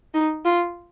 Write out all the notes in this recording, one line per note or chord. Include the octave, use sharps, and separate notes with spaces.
D#4
F4